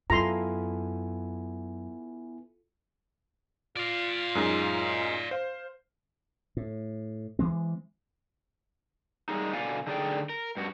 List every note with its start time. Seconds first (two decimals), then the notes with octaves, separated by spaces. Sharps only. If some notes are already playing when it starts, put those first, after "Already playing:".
0.10 F#2 B3 E4 F4 A4 G#5 A#5 C6
3.77 F4 D5 F5
4.35 F#2 G#3 D#4
5.31 C5 F5
6.57 A2
7.39 E3 G#3 C4
9.29 G3 G#3 A#3 D#4
9.53 B2 D3 A3 D5 F5 G#5
9.87 D3 D#4 G#4 D5 G5
10.29 A#4
10.57 G2 F#4